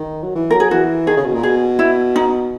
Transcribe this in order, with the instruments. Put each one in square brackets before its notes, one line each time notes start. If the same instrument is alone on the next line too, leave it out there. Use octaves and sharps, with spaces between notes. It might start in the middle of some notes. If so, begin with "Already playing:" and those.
Already playing: [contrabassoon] D#3
F#3
E3
[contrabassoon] F#3 [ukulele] A#4
[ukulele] G#4
[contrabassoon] E3 [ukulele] F#4
[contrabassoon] D#3 [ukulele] G#4
[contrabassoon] C#3
B2
A#2
[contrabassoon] B2 [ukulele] G#4
[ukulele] E4
D#4